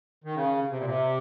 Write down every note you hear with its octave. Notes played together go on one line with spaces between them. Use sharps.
D#3
C#3
C3
A#2
C3